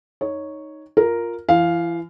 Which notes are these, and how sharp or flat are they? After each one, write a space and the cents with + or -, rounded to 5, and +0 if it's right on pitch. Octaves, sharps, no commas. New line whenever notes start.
D#4 +0 C#5 +0
F4 +5 A#4 +0
E3 +35 F5 +0